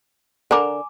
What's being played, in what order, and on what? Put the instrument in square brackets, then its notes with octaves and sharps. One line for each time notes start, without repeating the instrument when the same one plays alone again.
[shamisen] D3 A#4 [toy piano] G#5 A#5 D6